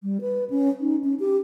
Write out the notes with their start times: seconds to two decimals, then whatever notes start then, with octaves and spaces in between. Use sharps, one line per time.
0.03 G3
0.21 B4
0.50 C#4
0.80 D#4
1.04 C#4
1.20 G4